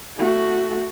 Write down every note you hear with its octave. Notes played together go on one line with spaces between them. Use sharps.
A3 F#4